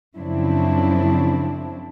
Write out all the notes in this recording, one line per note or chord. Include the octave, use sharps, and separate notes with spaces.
F#2 C#3 F3 C4 D4 E4